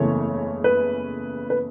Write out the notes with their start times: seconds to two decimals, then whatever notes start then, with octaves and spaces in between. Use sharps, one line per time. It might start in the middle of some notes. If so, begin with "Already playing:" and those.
Already playing: F#1 E2 C#3 E3 A3 C#5
0.64 B4
1.50 B4